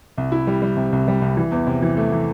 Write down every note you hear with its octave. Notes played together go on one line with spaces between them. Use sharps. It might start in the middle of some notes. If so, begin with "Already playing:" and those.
C2
E4
G3
G3
C3
C2
G3
C2
E3
E2
C3
E3
A3
E3